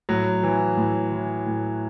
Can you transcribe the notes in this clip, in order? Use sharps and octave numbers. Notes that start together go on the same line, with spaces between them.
A2 F#3
E3
A2
E3
A2